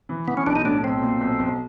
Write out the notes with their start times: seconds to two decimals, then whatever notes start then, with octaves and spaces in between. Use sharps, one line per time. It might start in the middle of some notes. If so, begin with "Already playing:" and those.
0.09 E3
0.28 E3 B3
0.37 C#4
0.46 B1 D4
0.56 D#4
0.65 A2 D4
0.83 B1 C4
1.02 A#2
1.21 B1
1.39 B1